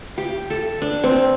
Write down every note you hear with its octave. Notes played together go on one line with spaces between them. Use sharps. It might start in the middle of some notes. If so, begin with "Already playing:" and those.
G4
A4
D4
C4